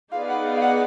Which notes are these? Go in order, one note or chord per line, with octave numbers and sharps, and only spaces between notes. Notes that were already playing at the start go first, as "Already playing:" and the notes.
B3 D#4 G#4 B4 D5 F5
F#5
F5
F5
F#5